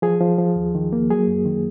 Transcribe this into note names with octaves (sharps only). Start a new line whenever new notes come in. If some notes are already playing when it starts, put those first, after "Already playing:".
F3 G#4
F3
F3
D#2
D#3
A#3
F#3 G#4
F#2
D#3